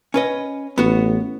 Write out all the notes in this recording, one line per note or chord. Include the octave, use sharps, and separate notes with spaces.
C#4 B4 D#5
A1 B3 F#4